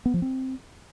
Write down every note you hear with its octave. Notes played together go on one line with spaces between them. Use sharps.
B3
F3
C4